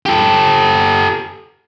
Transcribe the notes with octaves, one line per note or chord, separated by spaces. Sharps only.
G4 A4